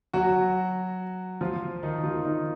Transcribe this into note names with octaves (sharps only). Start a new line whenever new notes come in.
F#3 F#4
F3 F4
D#3 D#4
F3 F4
D#3 D#4